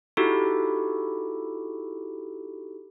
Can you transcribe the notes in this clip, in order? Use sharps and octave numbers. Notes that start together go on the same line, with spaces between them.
D#4 E4 F#4 G4 A4